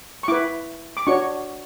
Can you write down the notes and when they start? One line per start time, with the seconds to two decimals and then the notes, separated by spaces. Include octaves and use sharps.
0.23 C#6
0.28 E4 B4 D6
0.97 D6
1.07 D4 F#4 C#5 C#6